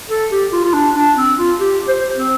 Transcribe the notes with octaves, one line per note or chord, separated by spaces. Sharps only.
A4
G4
F4
F4
D4
D4
C4
F4
G4
C5
C4